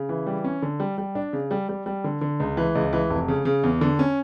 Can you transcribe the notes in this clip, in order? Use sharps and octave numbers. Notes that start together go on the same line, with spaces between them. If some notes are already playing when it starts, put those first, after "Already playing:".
Already playing: C#3
E3
G3
C#4
D3
G3
G3
D4
C#3
G3
G3
G3
D3
D3
C#2
E3
C#2
E3
F1
C#3
C#3
E2
D3
C#4